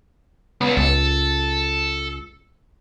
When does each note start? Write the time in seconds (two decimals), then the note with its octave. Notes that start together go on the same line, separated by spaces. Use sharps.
0.61 C#2 A#2 B3
0.77 C#2 A4